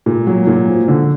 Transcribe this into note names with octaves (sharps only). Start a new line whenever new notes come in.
A#2
F#3
A#2
F3
D3